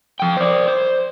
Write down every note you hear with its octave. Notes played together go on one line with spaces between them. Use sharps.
F3 G5
C5 D5
C5